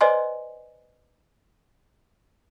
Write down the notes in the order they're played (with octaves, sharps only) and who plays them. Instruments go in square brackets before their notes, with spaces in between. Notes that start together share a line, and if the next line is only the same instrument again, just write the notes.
[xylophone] B4 C5 D5 D#5 G#5 C6